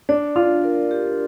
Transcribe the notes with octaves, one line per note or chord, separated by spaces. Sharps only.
D4 D5
D4 F4
A#4
G4